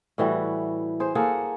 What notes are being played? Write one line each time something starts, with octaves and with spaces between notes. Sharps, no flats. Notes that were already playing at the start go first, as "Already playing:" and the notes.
A2 E3 G3 F#4
G#4 C5
A#3 G#4 A4 F#5